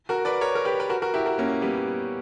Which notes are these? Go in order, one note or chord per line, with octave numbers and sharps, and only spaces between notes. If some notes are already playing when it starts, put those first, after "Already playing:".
F#4 A#4
B4 D5
A#4 C#5
A#4
G4 B4
B4
F#4 A#4
F#4 A#4
E4 G4
F#4 A#4
A#3 C#4
G3 B3